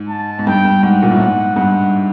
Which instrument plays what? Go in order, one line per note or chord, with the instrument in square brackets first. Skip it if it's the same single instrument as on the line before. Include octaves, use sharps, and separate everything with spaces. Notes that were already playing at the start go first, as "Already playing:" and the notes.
Already playing: [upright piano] G#2
[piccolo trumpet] A5
[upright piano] G#2
[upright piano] G2 [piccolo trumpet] G5
[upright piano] G2
[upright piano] G#2 [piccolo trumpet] F#5
[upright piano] A#2
A2
G#2
[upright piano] G2 [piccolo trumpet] F#5